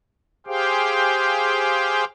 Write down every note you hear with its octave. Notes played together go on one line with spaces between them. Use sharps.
G4 G#4 C5 F5 G5